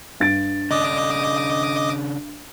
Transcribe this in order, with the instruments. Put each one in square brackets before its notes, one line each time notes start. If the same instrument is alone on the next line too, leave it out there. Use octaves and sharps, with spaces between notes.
[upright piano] G2 A6 D7
[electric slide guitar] C#3 D4 [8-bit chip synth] D#5 D6 D#6